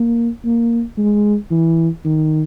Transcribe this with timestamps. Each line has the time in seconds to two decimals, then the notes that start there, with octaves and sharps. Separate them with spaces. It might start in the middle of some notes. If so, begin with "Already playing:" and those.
Already playing: A#3
0.45 A#3
0.98 G#3
1.51 E3
2.05 D#3